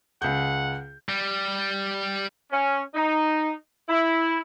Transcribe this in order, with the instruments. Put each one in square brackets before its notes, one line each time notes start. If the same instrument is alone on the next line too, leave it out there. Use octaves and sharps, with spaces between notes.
[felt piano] C#2 G6 [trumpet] F#5
[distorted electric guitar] G3
[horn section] C#4
D#4
E4